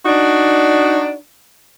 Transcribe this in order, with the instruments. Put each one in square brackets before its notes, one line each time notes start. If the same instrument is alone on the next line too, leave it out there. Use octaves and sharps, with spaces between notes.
[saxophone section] D4 D#4 F#4 D5